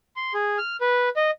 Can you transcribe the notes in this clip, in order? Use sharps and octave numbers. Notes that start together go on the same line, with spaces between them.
C6
G#4
F6
B4
D#5